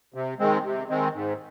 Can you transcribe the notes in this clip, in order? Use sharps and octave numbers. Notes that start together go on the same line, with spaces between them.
C3
D#3 G#3 C4
C3
D#3 G#3 C4
G#2